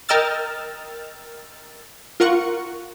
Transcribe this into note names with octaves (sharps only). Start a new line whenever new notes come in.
A#4 D#5 G5 E6 F6 A6
F4 A#4 F#5 C#6